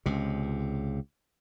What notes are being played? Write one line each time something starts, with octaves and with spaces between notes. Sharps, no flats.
C#2 C3